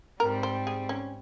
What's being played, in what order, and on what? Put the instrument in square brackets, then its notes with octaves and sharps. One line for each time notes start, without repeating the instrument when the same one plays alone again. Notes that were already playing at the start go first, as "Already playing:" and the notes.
[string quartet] G#2 G3 C4 [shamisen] A#4
[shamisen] C5
G#4
C#4